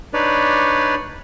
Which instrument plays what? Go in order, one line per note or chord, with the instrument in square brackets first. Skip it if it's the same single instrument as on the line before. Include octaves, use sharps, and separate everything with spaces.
[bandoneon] D4 D#4 B4 C#5 D5